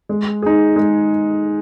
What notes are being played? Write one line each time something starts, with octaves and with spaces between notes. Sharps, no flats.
G#3
D#4 G#4
G#3